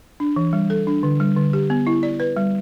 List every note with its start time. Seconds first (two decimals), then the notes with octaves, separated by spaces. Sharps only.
0.20 D4
0.36 E3
0.53 G3
0.70 A4
0.87 D4
1.03 D3
1.20 G3
1.37 D3
1.53 G4
1.70 B3
1.87 E4
2.03 D5
2.20 B4
2.37 G3